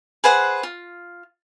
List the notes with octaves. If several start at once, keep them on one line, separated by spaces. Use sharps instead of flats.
G#4 B4 C5 F#5
F4